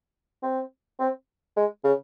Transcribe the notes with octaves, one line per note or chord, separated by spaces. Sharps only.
C4
C4
G#3
C#3